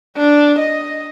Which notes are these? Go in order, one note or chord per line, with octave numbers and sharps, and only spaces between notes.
D4
D#5